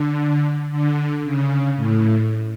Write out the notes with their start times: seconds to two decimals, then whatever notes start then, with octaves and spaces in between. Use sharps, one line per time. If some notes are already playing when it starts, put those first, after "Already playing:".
Already playing: D3
0.72 D3
1.24 C#3
1.76 A2